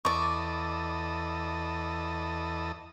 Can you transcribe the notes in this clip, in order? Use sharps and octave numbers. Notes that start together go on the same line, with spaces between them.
E2 A4 D5 D#5 C#6